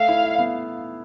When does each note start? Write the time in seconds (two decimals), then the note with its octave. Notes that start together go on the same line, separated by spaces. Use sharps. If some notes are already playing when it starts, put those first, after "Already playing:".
Already playing: A3 E5 F5
0.09 E4
0.23 E5
0.38 B3